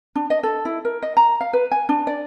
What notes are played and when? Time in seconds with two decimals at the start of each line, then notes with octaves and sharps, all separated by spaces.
0.15 D4
0.30 D#5
0.43 A4
0.65 E4
0.85 A#4
1.02 D#5
1.17 A#5
1.41 F5
1.53 B4
1.71 G#5
1.89 D4
2.07 D5